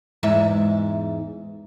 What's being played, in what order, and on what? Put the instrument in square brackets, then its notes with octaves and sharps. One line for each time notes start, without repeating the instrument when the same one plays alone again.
[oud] E2 G#2 E5